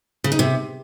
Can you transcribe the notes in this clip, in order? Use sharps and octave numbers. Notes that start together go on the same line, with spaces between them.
C#3
D#4
C3